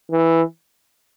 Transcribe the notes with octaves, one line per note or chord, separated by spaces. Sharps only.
E3